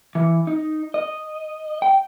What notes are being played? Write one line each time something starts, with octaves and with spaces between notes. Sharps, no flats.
E3
D#4
D#5
G5